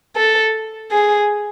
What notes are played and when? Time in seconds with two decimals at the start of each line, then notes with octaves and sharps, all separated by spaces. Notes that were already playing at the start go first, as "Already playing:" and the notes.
0.16 A4
0.92 G#4